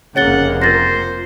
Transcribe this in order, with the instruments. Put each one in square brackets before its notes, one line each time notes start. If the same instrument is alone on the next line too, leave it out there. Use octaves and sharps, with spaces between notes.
[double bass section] F1 A#3 [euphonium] C#3 [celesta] C#5 A6 G7 [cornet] F#5
[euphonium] F4 [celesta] A#4 A6 A#6 [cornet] C5